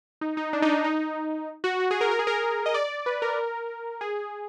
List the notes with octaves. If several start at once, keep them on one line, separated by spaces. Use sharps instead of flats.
D#4
D#4
D4
D#4
D4
D#4
F#4
F#4
G#4
A#4
A#4
G#4
A#4
D#5
D5
B4
A#4
G#4